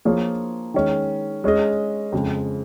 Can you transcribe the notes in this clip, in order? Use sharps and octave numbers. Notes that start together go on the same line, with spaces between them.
F3 A#3 F4 G#4 C#5
D#3 G#3 C#4
G#3 C#4 G#4 D#5
F2 C#3 G#3